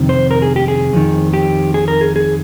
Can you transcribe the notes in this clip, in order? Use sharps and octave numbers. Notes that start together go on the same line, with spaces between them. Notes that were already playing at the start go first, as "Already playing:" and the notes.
Already playing: F2 C3 D#3
C5
A#4
G#4
G4
G#4
F2 D#3
G4
G#4
A#4
G#4
G#4